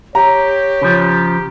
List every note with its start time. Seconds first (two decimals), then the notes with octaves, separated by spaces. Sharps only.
0.15 G4 C#5 A#5
0.82 C#3 F3